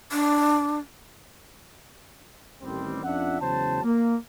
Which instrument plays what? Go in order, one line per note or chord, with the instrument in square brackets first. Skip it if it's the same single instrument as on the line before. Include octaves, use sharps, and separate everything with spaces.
[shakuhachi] D4
[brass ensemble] A1 D#3 G3 C4
F2 C#4 D4 F4 E5 F#5
E2 C#3 F#3 G#3 C5 A5
A#3